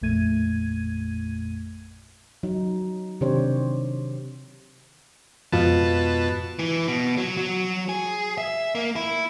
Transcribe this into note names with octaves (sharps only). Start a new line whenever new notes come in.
A1 F2 A#2 A3 G#6 D#7
F#3 D#4
C3 D#3 D4 G4 C5 C#5
F2 G#2 B2 F4 B4 A5
E3
B2
F#3
F#3
G#4
E5
A#3
E4